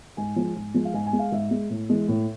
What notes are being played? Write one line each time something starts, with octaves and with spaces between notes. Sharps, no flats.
G#2 G#5
F3 G#3
G#2
F3 G#3
F5
G#2 G#5
G#5
G#3
F5
G#2 E5
G#3
A2
E3 G#3
A2